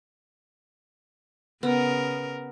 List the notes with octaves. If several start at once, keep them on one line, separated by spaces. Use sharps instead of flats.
C#3 B3 A#4